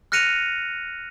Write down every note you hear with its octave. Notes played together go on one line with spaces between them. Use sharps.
F6 F#6 A#6 C#7 D#7 F7